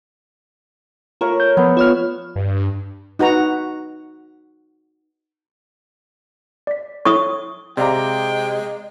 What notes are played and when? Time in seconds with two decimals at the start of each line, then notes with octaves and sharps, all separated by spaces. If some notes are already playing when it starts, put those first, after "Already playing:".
1.21 A3 F4 A#4 C#5
1.40 G6
1.57 F3 B3
1.77 F4 C#5 F6
2.35 G2
3.19 D#4 F#4 B4 A#5
6.67 D5 B6
7.05 E4 A4 C#5 C#6 D#6
7.77 C3 G#3 D5 F5 G5 A#5